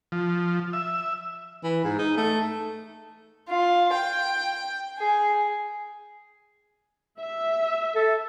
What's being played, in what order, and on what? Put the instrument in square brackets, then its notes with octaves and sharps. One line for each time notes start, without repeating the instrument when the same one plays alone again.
[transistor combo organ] F3
E5
[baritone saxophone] E3
G#2
D#4
A3
[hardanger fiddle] F4
G5
G#4
[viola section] E5
[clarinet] A4